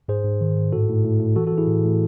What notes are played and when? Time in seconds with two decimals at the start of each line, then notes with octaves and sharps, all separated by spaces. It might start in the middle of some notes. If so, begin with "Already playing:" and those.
0.08 G#2 G#4 C5
0.24 G#2
0.41 D#3
0.57 G#2
0.73 A2 F#4 A4
0.89 A2
1.05 A2
1.20 A2
1.36 E3 F#4 A4
1.47 F#4 A4
1.52 E3
1.58 E4 G#4
1.68 A2
1.84 A2